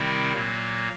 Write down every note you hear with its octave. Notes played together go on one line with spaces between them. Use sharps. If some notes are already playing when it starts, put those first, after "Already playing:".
Already playing: C3 D#3 G3 C4 E4
A#2 F#3 A#3